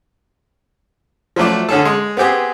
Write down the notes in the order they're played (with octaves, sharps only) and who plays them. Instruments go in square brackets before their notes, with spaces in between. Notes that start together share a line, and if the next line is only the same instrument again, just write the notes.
[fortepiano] F3 F#3 A3 D5
D3 C#4 G#4 A4
G#3
B3 C4 G4 G#4